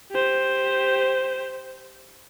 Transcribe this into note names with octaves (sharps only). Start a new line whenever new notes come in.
G4 C5